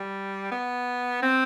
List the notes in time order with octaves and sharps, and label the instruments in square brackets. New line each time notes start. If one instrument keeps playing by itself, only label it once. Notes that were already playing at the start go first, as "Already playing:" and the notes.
Already playing: [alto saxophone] G3
B3
C4